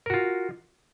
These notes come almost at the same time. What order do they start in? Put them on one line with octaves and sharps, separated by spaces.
A#4 F#4 F4